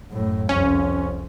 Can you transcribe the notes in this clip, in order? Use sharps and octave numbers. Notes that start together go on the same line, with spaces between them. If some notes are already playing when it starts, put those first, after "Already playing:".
F#2 A2
C2 F2 C#4